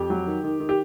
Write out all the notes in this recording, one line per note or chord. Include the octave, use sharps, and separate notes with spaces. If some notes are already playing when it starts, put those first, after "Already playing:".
Already playing: F2 G4
F#3
D#3
D#3
D#3
G4